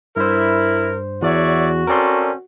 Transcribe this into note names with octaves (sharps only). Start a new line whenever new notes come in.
G2 E4 A#4 C5
E2 F#4 C#5 D5 E5
C4 C#4 A4 A#4 D5 C6